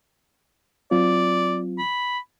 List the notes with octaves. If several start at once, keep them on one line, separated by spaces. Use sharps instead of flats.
F#3 C4 F4 D5
B5